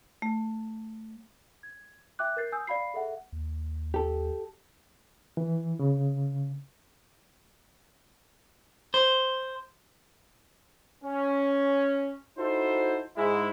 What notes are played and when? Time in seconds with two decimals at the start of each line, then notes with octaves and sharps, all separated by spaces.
0.22 A3
1.63 G#6
2.19 E5 G5 D6 F#6
2.37 A#4 G6 A6 C7
2.52 G#5 D#6 E6 G6
2.67 D5 F5 B5 C7
2.94 G#4 A4 E5 F#5
3.32 D#2
3.94 G4 A4
5.37 E3
5.79 C#3
8.94 C5
11.04 C#4
12.38 D#4 E4 F#4 A4 C5
13.17 G#2 G#3 E4